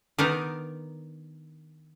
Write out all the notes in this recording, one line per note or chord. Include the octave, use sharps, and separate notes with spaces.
D#3 B3 D4 D#4 A#4